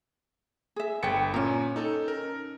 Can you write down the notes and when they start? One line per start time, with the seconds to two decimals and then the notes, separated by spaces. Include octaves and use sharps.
0.76 G#4 E5
1.03 G1 B4 G5 C#7
1.34 A#2 C#4 A#5
1.76 D#4 A4
2.08 A#4